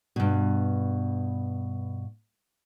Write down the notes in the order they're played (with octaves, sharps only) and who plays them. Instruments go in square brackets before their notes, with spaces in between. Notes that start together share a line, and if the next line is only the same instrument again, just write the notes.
[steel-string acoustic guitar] G2 B2